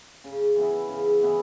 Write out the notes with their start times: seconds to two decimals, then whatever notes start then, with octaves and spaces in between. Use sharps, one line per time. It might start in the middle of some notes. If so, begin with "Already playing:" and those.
0.24 C#3
0.56 E3 B3 E4
0.89 C#3
1.21 E3 B3 E4